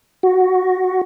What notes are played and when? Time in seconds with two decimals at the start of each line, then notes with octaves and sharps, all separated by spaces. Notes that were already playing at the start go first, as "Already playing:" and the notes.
0.23 F#4